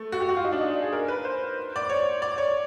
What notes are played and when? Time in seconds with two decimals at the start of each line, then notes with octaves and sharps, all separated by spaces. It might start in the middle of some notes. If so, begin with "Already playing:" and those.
Already playing: A3
0.12 F#4
0.20 G4
0.29 F#4
0.37 F4
0.45 D#4
0.53 D4
0.61 D#4
0.82 G#4
0.93 A#4
1.08 B4
1.25 C5
1.76 D5
1.89 C#5
2.22 D5
2.38 C#5